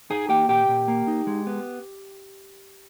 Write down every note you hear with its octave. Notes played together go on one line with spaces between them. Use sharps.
D#4 G#4 G#5
A#3 G4 G5
A#2 G4 G5
A#2
A#3
D#4
G#3
B3